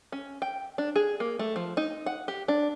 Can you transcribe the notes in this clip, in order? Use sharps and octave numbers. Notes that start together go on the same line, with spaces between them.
C#4
G5
D4
G#4
A#3
A3
F3
D#4
F#5
G4
D4